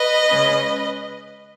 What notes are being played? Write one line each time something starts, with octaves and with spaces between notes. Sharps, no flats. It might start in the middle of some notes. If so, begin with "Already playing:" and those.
Already playing: B4 D#5
C#3 G#3 C#4